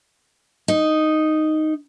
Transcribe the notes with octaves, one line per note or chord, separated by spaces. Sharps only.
D#4